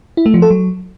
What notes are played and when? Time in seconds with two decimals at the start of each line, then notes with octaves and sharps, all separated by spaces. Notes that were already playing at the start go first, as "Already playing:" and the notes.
0.17 E4
0.26 A3
0.34 F3
0.42 A4
0.51 F#3